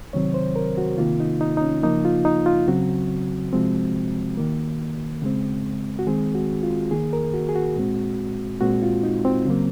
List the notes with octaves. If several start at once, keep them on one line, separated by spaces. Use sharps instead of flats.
C3 D#3 F#3 C4 C#5
C5
A#4
F#4
C3 D#3 A#3 F4
D#4
D#4
D#4
C#4
C#3 F3 A#3 D#4
F4
D#4
F4
C#3 F#3 C4 F#4
C3 F3 G#3 C4
D#3 A#3
C#3 G#3 C4
F#4
D#3 G#3 C4 G#4
F#4
F4
D#3 A#3 G#4
A#4
F#4
G#4
F#4
A#2 G#3 C4
A#2 G#3 C4 F#4
F4
D#4
C4
C#3 F#3 A#3